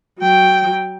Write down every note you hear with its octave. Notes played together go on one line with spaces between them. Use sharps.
F#3 G5